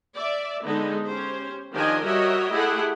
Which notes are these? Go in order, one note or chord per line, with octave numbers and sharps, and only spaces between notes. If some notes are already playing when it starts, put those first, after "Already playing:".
D5 E5
D3 G#3 B3 D#4
C#4 G4 C5
D#3 F3 D4 G4 D#5 G#5
G3 F#4 A#4 C#5 D#5 E5
A3 E4 G4 G#4 F#5